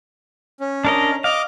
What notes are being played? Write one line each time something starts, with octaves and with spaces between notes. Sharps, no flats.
C#4
D4 A#4 D#5
D#5 F5 D6